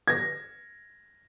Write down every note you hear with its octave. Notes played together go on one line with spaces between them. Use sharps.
G#6 A#6